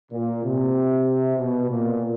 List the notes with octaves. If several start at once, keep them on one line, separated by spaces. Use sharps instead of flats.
A#2
C3
B2
A#2